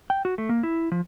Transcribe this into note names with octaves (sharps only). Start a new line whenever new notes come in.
G5
F#4
A3
A#3
E4
F3